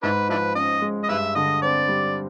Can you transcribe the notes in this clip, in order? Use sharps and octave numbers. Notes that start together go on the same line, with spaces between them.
G#2 D4 E4 B4
F3 D4 E4 B4
C#4 D#5
G#3
D#5
G2 B4 E5
D3 D#5
C4 D5
G3